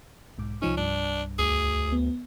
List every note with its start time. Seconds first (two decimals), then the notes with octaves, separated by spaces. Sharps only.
0.38 B1 G#2 D6
0.62 C2 F3 C#4 D#4
0.77 C2 G2 D4
1.39 D2 G#4
1.92 B3